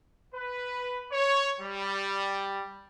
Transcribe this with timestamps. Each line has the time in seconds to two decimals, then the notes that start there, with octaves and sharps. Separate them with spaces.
0.35 B4
1.12 C#5
1.61 G3